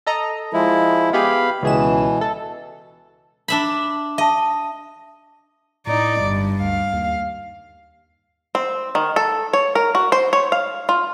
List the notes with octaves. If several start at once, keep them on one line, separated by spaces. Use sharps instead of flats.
A4 D#5 A#5
F3 G#3 E4
B3 G4 G#4 F5 B5
C#2 B2 E3 G#4 E7
A4
D4 E5 B5
D#5 E5 A5
A2 D#4 D5
G1 G2
D2 F5
D#2
C4
D#3
A4
C#5
A#4
F#4
C5
C#5
F5
F4